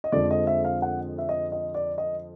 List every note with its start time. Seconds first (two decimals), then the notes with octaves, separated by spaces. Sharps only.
0.04 D#5
0.12 F2 D3 F3 G#3 D5
0.31 D#5
0.47 E5
0.64 F5
0.82 F#5
1.18 E5
1.29 D#5
1.52 D#5
1.74 D5
1.98 D#5